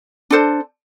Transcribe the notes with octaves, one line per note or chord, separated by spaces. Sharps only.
D4 A4 C5